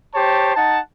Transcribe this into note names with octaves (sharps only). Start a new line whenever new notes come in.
G4 C5 C#5 A5
D#4 F#5 A5